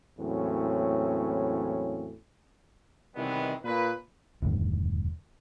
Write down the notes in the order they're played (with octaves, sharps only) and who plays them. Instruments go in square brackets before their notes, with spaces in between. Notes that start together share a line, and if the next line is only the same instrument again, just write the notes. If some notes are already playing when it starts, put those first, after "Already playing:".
[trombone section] E2 A2 F#3 A#3 C4 C#4
[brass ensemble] C3 D#3 E3 G3 G#3 B3
A#2 B4
[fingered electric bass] E1 D2 G2 D#3